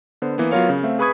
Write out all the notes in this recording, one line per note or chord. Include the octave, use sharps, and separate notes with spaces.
D3 B3 C5
E3 A#3 B3
F#3 B3 F4 A#4 C#5 F5
C#3
A3 C4 E5 F5
G#4 B4 B5 C#6 D#6 G#6